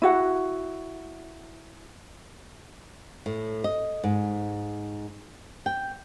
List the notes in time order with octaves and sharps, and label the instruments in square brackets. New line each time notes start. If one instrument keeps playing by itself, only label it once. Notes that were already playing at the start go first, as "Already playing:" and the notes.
[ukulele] E4 F#4 F#5
[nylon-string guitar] A2
D#5
G#2
G5